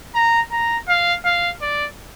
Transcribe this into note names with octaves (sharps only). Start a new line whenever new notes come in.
A#5
A#5
F5
F5
D5